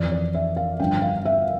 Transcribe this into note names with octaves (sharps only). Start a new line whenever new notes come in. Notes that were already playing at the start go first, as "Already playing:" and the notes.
Already playing: F2 E3 D5
D5
E5
F5
G2 D3 F3 G5
F5
E5